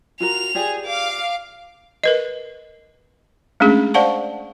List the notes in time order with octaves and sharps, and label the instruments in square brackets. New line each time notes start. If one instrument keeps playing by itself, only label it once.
[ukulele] F4 F#4 A#4 [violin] F7
[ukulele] F4 G4 D5 [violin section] G#4
[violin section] F5 [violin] D6
[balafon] A#4 B4 D#5
G#3 A3 C#4 D4 G#4
C5 D5 F5 F#5 A5 C#6